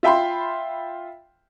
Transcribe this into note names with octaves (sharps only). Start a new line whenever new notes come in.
F4 E5 G5 B5 C6